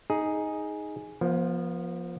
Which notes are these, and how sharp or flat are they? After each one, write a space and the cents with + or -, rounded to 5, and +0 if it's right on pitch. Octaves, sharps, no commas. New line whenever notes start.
D#4 +5 G#4 +0
F3 +0 B3 -45